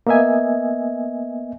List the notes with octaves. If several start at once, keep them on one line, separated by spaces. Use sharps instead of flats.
A#3 B3 D#5 E5 G#5